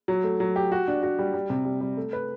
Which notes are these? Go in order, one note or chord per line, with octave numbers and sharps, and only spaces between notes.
F#3
A3
F#3
G4
F#4
D4
F#4
G3
G3
C3
G3
G3
A3
B4